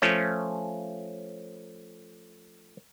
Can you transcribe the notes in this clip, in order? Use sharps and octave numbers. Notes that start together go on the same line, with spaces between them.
F3 A3 C#4